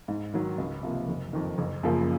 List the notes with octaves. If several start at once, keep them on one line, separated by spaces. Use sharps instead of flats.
G#2
D#3 F#3
C#2
C3 F3 A#3
F#1
F2 D#3
F#1
F#2 C#3 F3 A#3